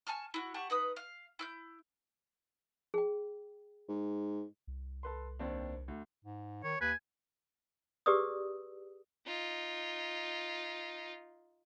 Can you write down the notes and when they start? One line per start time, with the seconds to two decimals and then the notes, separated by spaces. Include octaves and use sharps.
0.07 G#5 A5 C#6 F6
0.34 E4 F#4
0.54 G4 F#5 A5 C#6
0.70 D#4 B4 D#6
0.96 F5
1.39 E4 F6 G6
2.94 G#4 G5
3.89 G#2
4.67 C2
5.03 A4 B4 C6
5.39 D#2 C4 D4
5.88 D2
6.24 G#2
6.63 D#3 C#5
6.81 D#2 B4 G#5
8.06 G4 G#4 B4 D5 D#6 E6
9.26 D#4 F4